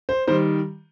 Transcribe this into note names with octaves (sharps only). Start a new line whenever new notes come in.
C5
D#3 G3 C5